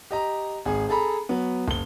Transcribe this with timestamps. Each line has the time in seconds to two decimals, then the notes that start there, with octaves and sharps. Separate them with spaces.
0.11 G4 D#5 A#5
0.65 G#1 G#4
0.89 G#4 A4 A#5 B5
1.29 F#3 B3
1.68 F#1 G7